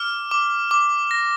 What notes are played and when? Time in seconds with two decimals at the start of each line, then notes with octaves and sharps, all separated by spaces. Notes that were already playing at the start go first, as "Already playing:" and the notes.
Already playing: D6 F6
0.31 D6
0.71 D6
1.11 A#6